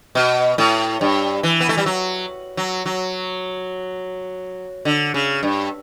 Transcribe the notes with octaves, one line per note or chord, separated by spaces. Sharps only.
B2
A2
G2
E3
B3
A3
G3
F#3
F#3
F#3
D3
C#3
G2